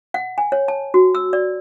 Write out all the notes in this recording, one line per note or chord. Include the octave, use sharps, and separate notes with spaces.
F#5
G#5
C#5
A5
F#4
E6
D5